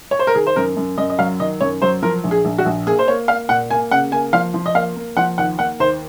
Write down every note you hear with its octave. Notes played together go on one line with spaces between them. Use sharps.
C#5
C5
A#4
D#3 G#4
C5
F#2 A#4
F#2
F#2 D#5
D#5
F#3 F5
D#3 D#5
F#2 C#5
F#3 C5
F3 A#4
A#1
G#4
A#1
F#4
A#1
A#3 G#4
C5
A#3 C#5
A#3 F5
A#2 F#5
A#3 G#5
C#3 F#5
A#3 G#5
F3 F5
F3
D#5
A#3 F5
A#3
F3 F#5
D#2 F#5
A#3 F#5
D#2 C5